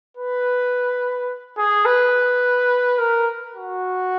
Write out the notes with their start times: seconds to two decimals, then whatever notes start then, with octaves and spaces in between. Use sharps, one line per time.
0.17 B4
1.58 G#4
1.86 B4
2.99 A#4
3.55 F#4